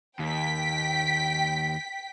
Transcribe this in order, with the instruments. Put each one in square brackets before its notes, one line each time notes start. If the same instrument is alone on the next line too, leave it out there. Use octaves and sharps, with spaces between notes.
[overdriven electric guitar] D#2 [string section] G5 B6